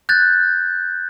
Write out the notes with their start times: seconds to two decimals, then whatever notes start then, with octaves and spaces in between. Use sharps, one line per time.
0.09 F#6 G6 A6